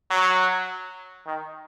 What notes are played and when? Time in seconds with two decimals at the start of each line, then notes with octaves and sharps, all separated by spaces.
0.11 F#3
1.26 D#3